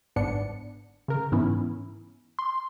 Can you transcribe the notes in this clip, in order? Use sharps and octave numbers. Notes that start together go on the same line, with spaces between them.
G1 G#2 B3 D4 C#7
C#3 A#4
G#2 E3 B3 C#4 E4
C6